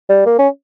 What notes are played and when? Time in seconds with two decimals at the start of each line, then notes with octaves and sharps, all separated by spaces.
0.09 G3
0.26 A#3
0.39 C#4